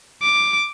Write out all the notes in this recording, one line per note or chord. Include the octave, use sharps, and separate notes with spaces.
D6